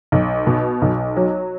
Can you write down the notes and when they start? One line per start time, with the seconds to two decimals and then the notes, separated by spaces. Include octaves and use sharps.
0.12 B1
0.47 B2
0.82 B1
1.16 F#3